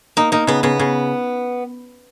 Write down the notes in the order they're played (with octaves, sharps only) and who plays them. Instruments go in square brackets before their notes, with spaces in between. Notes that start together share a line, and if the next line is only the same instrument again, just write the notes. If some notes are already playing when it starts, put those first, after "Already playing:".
[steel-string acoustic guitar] A#3 [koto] D#4
[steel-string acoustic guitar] A#3 [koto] D#4
[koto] C#3 [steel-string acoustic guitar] B3
[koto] C#3 [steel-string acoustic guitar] B3
[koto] C#3